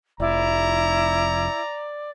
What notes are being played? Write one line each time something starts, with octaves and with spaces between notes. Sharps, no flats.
F1 E4 D5 A#5